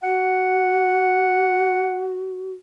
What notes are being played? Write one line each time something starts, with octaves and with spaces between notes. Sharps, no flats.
F#4 F#5